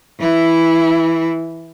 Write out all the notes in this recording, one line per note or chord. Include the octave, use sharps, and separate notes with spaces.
E3 E4